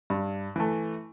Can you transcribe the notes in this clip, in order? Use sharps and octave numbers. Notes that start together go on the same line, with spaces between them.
G2
E3 A3